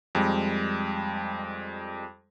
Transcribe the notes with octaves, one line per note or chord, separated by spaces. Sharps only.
F2 G3 G#3